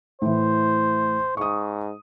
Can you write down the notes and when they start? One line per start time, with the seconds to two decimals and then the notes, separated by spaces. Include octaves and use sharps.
0.22 A2 E3 C5
1.37 G#2 C#6 D#6